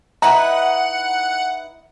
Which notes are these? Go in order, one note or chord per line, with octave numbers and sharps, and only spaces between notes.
D#4 E4 B4 F#5 A#5